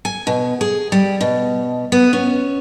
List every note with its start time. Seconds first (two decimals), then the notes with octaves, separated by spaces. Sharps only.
0.05 G#5
0.27 B2
0.61 G#4
0.92 G3
1.21 B2
1.92 B3
2.13 C#4